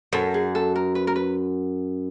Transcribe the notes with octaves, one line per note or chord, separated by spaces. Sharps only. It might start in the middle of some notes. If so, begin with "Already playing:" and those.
F#2 A4
G#4
A4
A#4
B4
A#4
B4